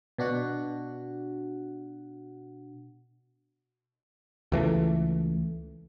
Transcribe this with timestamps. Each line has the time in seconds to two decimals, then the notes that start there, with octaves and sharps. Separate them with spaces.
0.18 B2 D4 F#4 F#5
4.52 C#2 E3 G#3 A3